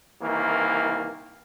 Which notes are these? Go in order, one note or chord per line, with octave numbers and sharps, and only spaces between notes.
C2 D#3 E3 A#3